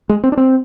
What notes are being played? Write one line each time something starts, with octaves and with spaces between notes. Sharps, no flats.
G#3
C4
D4
C4